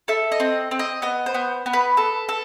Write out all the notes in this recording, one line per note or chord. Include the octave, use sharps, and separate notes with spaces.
A4 E5
D#5
C4
C4
D#5
B3 D#5
C5
B3
B3
B4
A4
A4